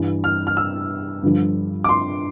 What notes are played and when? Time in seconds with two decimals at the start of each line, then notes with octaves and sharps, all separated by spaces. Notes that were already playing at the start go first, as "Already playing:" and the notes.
Already playing: G2 E3 G3
0.24 F6
0.47 F6
0.57 E6
1.23 G2 D3 F3
1.84 D6
1.89 C6